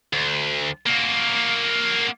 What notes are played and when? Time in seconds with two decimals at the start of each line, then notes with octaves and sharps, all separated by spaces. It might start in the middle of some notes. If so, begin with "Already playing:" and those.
0.13 D2
0.86 A#3 F#4